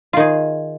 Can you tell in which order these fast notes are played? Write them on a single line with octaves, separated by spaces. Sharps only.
F4 D#3 G#4